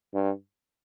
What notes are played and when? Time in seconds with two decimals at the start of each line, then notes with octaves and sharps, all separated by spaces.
0.14 G2